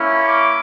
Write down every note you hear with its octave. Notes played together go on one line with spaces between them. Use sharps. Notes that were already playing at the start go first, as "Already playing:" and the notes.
Already playing: A#3 C#4 E4
D6